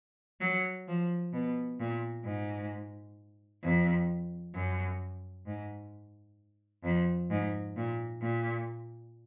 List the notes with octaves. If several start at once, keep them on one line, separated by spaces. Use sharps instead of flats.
F#3
F3
B2
A#2
G#2
F2
F#2
G#2
F2
G#2
A#2
A#2